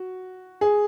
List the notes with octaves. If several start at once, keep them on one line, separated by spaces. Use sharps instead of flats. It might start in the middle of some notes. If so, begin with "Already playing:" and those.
Already playing: F#4
G#4